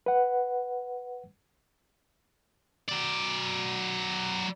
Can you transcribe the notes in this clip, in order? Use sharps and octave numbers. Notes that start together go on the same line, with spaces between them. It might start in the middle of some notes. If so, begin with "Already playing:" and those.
B4 F#5
F#3 D5